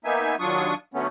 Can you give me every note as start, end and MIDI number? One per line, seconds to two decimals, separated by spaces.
0.05 0.36 58
0.05 0.36 59
0.05 0.36 63
0.05 0.36 76
0.05 0.36 80
0.39 0.74 39
0.39 0.74 54
0.39 0.74 62
0.39 0.74 65
0.39 0.74 85
0.39 0.74 87
0.94 1.07 50
0.94 1.07 54
0.94 1.07 57
0.94 1.07 59
0.94 1.07 61